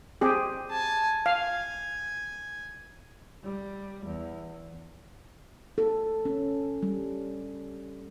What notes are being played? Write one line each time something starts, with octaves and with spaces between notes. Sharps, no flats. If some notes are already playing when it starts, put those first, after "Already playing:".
C4 G4 G#4
G#5 A5
F5 G#5
G3
E2
A4
C#4
G3